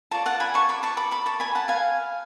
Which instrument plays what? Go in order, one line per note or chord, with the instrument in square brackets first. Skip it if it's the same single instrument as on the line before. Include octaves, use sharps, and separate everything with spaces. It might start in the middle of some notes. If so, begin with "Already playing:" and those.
[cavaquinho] F4 A4 D5 A5 C#6
F#5 A5
G#5 B5
A5 C#6
B5 D6
A5 C#6
B5 D6
B5 D6
A5 C#6
G#5 B5
F#5 A5
F5 G#5